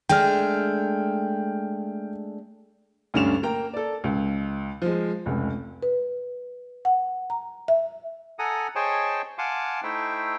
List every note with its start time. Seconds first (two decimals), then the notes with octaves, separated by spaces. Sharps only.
0.09 G#3 A3 D4 G5 F6
3.14 D2 G2 C#4 D4 E7 F7
3.43 A#3 A#4 G5 A#5
3.73 A4 D5
4.04 C#2
4.82 F3 G#3
5.26 F1 C#2
5.83 B4
6.85 F#5
7.30 A#5
7.68 E5
8.39 A4 F#5 G#5 A#5 D#6
8.75 G#4 C5 C#5 D#5 G5 A5
9.38 F5 F#5 G#5 A5 C6 D6
9.83 A3 D#4 E4 C5 E5 G5